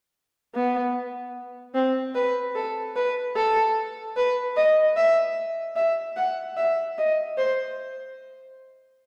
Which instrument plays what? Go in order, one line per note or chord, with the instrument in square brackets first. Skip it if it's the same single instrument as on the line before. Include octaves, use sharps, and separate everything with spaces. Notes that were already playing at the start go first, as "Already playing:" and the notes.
[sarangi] B3
C4
B4
A4
B4
A4
B4
D#5
E5
E5
F#5
E5
D#5
C5